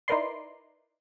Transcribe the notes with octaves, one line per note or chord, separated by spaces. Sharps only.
D#4 E4 A#4 B4 D5 C6